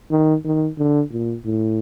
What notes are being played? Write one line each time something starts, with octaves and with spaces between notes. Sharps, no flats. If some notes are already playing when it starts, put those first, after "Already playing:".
D#3
D#3
D3
A#2
A2